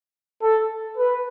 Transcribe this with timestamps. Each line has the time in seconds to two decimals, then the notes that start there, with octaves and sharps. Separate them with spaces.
0.42 A4
0.97 B4